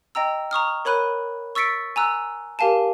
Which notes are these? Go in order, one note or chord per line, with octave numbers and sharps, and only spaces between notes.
D#5 G5 A#5 E6
A#5 C#6 D#6 F6
A#4 C#5 B5 F#6 D#7
C#6 E6 A6 B6 C#7 D7
G#5 A#5 E6 F#6
G4 A#4 F5 G#5 A5